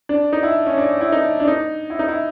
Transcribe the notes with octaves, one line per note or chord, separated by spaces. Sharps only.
D4
D#4
E4
C#4
D4
E4
D#4
D4
D#4
E4
D#4
E4